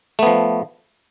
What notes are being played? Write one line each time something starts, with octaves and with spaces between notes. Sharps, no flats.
F3 A3 B3